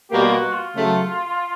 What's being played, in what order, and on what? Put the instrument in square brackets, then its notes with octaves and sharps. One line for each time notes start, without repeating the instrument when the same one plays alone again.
[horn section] B2 G3 A#3 [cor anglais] G4
[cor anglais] F4
F#4
F4
[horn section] C#3 F#3 A3